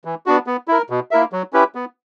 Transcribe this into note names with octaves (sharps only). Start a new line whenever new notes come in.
E3
B3 D4 F#4
B3
E4 A#4
B2
A#3 E4 A#4 E5
F#3
C#4 E4 G4 B4
B3